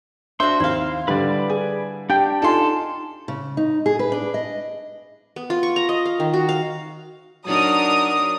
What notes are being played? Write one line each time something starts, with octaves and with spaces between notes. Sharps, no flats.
D4 F#4 C5 E5 C6
D#2 C4 E4 F5
D3 G3 B4 D5
G#4
D4 G4 G5
D#4 F4 A4 G#5 C6
C#3
D#4
G#4
B4
D4
D#5
B3
F4
C#6
A#5
D#5
F5
D#3
F#4
F5
F#3 D4 D#4 A#4 D#6